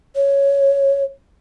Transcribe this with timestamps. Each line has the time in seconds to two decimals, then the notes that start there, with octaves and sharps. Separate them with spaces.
0.16 C#5